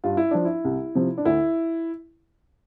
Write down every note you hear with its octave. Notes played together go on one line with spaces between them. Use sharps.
G2 F4
E4
F3 D4
E4
C2
C3 F3
D4
D2 E4